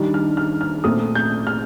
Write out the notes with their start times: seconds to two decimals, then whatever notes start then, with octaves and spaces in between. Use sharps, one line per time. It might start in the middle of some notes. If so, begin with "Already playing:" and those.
Already playing: D#3 G3 D4
0.14 F6
0.37 F6
0.61 F6
0.84 A#2 A3 C4 D#6
1.15 G6
1.47 F6